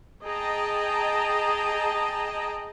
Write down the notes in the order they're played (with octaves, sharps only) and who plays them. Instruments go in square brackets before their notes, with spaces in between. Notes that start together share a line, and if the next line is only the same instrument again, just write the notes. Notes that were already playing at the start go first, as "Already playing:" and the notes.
[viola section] G#4 D#5 G5 A5 A#5